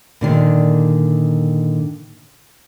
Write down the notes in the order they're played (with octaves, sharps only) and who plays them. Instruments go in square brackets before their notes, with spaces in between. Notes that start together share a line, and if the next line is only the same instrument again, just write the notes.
[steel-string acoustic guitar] A#2 D3 D#3